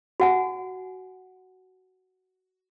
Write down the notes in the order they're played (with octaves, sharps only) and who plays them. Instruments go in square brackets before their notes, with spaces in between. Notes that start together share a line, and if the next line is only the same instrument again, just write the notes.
[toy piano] F#4 F#5 G#5